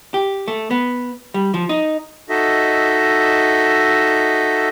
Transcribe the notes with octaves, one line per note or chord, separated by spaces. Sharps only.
G4
A3
B3
G3
F3
D#4
D#4 F#4 A4 D#5 E5